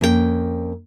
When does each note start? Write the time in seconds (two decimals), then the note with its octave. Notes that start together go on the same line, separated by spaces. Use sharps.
0.01 F2 A#3 C#4 A4 G5